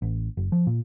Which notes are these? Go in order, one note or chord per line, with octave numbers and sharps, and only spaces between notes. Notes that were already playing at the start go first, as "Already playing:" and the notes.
A1
F#1
F3
A#2